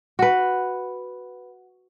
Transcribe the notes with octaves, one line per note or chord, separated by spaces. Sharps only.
F#4 B4